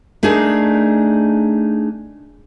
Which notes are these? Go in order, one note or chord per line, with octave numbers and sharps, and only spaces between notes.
A3 D4 D#4 G#4 A#4